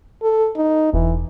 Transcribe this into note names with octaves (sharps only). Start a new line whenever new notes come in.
A4
D#4
E1 E3